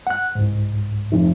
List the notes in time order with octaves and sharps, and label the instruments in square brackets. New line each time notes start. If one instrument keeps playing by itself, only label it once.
[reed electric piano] F#5 F#6
C2 G#2
[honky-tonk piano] F1